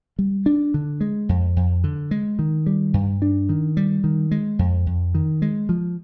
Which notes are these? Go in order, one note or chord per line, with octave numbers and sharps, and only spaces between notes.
G3
D4
D3
G#3
F2
F2
D3
G#3
D#3
G3
G2
D4
D#3
G3
D#3
G#3
F2
F2
D#3
G#3
F3